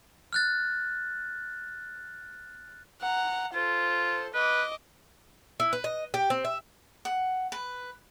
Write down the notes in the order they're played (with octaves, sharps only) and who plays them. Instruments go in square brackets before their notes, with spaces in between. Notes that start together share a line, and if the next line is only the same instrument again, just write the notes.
[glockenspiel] F6 F#6 A6
[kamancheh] F#5 A#5
[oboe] F4 [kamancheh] A4 C5
[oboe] B4 [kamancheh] D#5 D6
[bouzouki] E4
B4
D#5
G4
C4
E5
[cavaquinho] F#5
B4